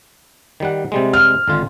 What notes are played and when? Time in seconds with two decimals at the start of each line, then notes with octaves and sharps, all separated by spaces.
0.60 D#3 G3 F#5
0.92 C3 G3 G#3
1.13 F6
1.48 G#1 D3 F4